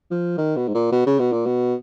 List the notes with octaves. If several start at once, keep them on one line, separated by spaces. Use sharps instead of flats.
F3
D#3
B2
G#2
A#2
B2
C#3
B2
A#2
B2